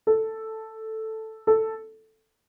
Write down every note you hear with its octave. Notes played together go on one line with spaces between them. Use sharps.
A4
A4